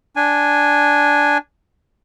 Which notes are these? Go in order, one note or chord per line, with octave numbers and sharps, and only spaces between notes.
D4 G#5